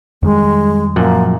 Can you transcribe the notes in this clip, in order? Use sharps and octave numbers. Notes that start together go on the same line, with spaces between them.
F2 D#3 G3 G#3
F#2 A#2 F3 A#3 F#5